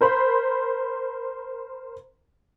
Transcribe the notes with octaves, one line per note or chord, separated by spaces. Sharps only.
A#4 C5 B5 C6